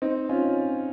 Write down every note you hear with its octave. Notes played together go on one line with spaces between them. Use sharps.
C4 D#4
C#4 F4